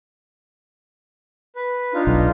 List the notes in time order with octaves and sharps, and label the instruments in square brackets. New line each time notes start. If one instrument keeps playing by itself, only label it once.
[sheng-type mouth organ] B4
D4 D#4 F4
[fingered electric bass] B1